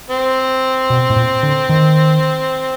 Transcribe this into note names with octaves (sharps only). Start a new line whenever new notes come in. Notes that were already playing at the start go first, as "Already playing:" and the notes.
C4
B2
A2
A#2
D3
D#3